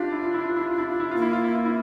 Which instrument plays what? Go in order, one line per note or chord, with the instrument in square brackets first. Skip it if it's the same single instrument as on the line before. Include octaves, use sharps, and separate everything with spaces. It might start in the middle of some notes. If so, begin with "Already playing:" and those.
Already playing: [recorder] D4 [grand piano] F4 G4
[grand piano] E4
F4
E4
F4
E4
F4
E4
F4
E4
[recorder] A#3 [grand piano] F4
[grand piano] E4
F4
E4
F4
E4